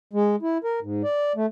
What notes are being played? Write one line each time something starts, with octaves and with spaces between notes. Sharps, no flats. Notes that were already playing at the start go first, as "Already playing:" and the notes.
G#3
E4
A#4
G#2
D5
A3